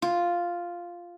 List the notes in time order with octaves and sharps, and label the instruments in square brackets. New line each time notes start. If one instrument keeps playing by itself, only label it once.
[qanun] F4